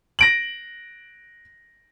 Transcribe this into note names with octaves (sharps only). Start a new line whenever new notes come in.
A#6 D7 F#7